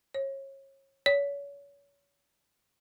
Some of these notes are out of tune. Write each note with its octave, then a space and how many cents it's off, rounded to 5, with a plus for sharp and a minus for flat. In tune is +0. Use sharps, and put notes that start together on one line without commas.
C#5 -30
C#5 +35